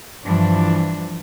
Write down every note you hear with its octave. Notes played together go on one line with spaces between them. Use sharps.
G2 E3 F3 D4